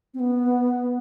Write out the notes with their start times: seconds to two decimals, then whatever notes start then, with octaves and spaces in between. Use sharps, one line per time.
0.14 C4
0.20 B3